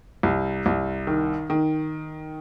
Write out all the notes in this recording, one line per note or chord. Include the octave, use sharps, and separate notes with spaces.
C2
C2
D#3
D#3